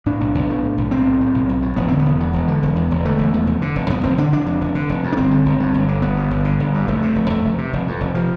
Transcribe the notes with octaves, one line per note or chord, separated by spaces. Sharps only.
A2 D4
B1
B1
A2
A2
B1
B1 C4
A2
A2
B1
B1
A2
E1 B3
D3 C4
B3
E1
E2
E1
D3
E1
E2
E1
D3 A3
E1
E2
F1
D3
F1
F2 B3
F1 C4
D3 D4
F1 D4
F2
F1
D3
F1
F2
D4
G1 C4
D3
G1
G2
G1
D3
G1 B3
G2
G1
D3
G1
G2
F1 A3
C3
F1
F2 A3
F1
C3
F1
F2
F1
C3 F3